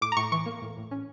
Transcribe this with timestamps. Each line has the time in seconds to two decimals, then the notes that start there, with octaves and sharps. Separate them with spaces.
0.01 A2 D6
0.12 A#5
0.17 A2 C#6
0.32 E3 C#6
0.46 A#3
0.62 A2
0.77 A2
0.91 C#4